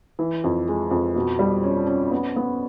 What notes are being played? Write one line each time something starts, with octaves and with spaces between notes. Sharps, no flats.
E3
F2
G#3
F2
B2
G3
C#4
C#4
B3
B3